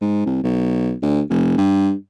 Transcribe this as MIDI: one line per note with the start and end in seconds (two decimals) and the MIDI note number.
0.01 0.24 44
0.25 0.39 36
0.43 0.93 35
1.02 1.21 38
1.30 1.54 29
1.58 1.93 43